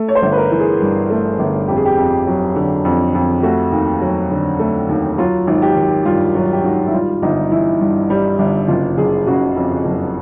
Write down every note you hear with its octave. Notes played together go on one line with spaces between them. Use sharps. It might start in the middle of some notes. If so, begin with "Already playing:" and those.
Already playing: A3
C#5
C5
G1
B4
A#4
E3
G#4
G2
A3
G1
F2 G4
G#4
G4
F2
F#3
D3
F2
F2
G4
A3 F#4
D#2
F#3
D3
A3
D#2
F#3 F4
G#1
G4
D#3
G2 F4
F#3
G4
G#1 F#4
E4
G3 F4
G1 D#4
E3 E4
G2
G3
G1
F#1 F4
F#1 G#4
C#3 F#4
F2
F#1